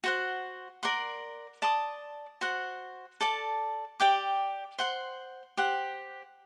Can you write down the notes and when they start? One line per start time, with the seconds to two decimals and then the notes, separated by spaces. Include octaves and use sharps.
0.04 F#4 C5 F#5
0.83 A#4 D5 F#5 C6
1.62 D5 A5 C6 D#6
2.41 F#4 C5 F#5
3.21 A4 D5 A5
4.00 G4 D5 G5 D6
4.79 C5 F#5 C6
5.57 G4 C5 F#5